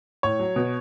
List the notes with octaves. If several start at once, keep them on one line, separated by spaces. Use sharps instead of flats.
A2 C#5
F#3
B2